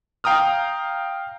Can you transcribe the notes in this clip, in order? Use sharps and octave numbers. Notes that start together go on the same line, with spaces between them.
F5 G5 A#5 D#6 F6